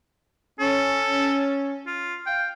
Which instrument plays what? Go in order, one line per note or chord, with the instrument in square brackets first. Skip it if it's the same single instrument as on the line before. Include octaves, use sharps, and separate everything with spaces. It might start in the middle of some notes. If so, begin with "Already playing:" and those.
[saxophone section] C#4 [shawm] A4
[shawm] F4
[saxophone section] F5 [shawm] G5